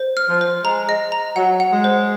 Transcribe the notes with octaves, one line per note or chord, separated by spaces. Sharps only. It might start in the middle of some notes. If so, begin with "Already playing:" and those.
Already playing: C5
F6
F3
C5
G#3 A#5
D#5
A#5
F#3 F#5
F#5
G#3
C5